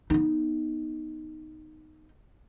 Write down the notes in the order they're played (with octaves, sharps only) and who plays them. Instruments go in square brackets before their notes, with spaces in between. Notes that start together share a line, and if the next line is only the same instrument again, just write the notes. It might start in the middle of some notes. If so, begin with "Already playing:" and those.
[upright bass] B3 D#4